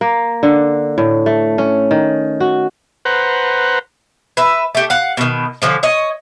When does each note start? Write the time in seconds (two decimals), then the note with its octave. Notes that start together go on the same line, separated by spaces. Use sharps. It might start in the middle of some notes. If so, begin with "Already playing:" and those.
0.01 A#3
0.43 D3
0.98 A2
1.26 A3
1.58 C#4
1.91 D#3
2.40 F#4
3.05 B4 C5 F#5 A#5
4.37 B4 E5
4.75 A3 G4
4.90 F5 F#5
5.17 B2 D#3
5.62 D3 F3 C#4
5.83 C#5 D#5